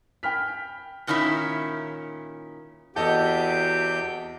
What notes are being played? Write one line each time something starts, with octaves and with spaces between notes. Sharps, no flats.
G5 G#5 B5 F6 B6
A#2 D#3 C#4 E4 E5
E2 C3 F#4 G4 A4 D#5 G6